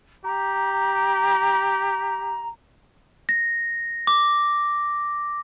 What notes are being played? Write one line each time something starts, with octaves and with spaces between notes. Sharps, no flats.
G4 A#5
A#6
D6